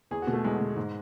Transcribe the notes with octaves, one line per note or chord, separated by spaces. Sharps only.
E2 G#4
F#4
B2
A3
E2 G#3
B2
G#2